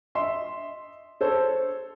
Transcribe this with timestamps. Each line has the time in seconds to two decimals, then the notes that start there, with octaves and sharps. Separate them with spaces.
0.15 D#5 E5 C6
1.21 A4 C5 C#5